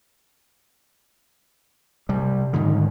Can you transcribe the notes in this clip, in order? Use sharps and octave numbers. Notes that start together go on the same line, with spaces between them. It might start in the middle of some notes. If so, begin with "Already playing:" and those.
C3 G3
G#2 D3 D#3